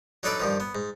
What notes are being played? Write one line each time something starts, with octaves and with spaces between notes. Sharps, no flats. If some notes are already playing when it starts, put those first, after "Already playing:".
F#3 D4 D#4 A4 B4 D5
G2 D#3 F3
B3
G#2